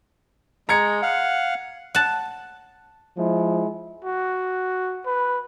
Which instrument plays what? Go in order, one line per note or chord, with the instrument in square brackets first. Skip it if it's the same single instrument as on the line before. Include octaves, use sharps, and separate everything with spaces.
[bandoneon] G#3 [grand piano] A#5 G#6 C#7
[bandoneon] F5 F#5
[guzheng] F#5 A5
[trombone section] F3 G#3 E4
[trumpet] F#4
B4